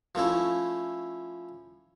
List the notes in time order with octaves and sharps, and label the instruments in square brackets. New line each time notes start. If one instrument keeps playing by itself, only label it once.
[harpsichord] F3 A3 C#4 E4